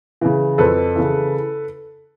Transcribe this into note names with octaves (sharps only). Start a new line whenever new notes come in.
C#3 E3
F2 A4 B4
C#3 E3